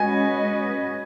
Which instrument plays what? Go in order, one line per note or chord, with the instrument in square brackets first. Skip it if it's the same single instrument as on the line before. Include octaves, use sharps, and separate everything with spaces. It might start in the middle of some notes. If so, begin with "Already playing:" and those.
Already playing: [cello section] G#3 C#4 F#4 B4 D#5 [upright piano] G#5